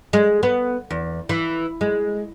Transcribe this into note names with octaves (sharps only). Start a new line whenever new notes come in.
G#3
B3
E2
E3
G#3